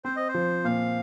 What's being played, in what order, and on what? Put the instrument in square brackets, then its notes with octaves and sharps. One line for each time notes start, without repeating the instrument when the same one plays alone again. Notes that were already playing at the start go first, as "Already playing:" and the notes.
[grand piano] C4 [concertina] C5
[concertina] D#5
C5
[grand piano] F3
[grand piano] A#2 [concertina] F5